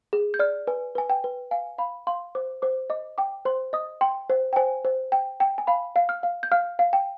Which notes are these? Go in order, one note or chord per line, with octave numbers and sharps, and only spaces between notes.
G#4
G6
D5 F6
B4 G#5
B4 G#5
G5
B4
F5 G#5
F5 B5
F5 C6
C5 D6
C5 D6
D#5 D6
G5 D6
C5 C6
D#5 D#6
G5 C6
C5
G5
C5 G#5
C5
G5
G5
G#5
F5 B5
F5
F6
F5
G6
F5 F6
F5
G5